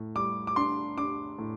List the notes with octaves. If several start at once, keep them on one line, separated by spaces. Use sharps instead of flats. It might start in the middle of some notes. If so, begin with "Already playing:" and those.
Already playing: A2
G3 D6
D6
D4 C6
D4 D6
A2